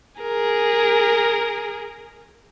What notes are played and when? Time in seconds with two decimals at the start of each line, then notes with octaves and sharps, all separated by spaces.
0.21 G#4 A#4